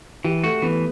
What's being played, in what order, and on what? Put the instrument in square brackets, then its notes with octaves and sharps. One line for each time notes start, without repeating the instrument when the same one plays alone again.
[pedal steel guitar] E3 [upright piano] G4
[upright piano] A3 [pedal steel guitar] F#4
[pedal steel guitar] E3 [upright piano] B3